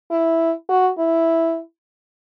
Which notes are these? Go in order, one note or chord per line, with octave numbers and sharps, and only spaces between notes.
E4
F#4
E4